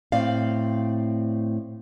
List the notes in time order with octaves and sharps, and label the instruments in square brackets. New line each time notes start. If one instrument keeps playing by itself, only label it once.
[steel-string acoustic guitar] A2 C4 D5 F5